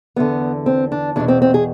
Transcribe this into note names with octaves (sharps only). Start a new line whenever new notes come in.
E2 D3 B3
C4
D4
E2 B2 D4
C4
C4
G#4